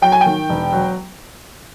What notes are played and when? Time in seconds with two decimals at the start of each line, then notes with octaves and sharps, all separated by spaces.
0.02 F#3 G5
0.12 G#5
0.21 G5
0.26 D#3
0.49 E1
0.73 F#3